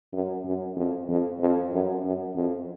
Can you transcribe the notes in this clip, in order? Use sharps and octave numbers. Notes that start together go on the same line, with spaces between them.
F#2
F#2
F2
F2
F2
F#2
F#2
F2